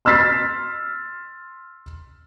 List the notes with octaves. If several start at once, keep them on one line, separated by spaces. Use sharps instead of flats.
C6 E6 F6 A6 B6 C7